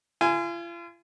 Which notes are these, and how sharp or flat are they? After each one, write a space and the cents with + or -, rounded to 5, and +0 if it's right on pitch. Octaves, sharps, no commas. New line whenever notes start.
F4 -40 G#5 +0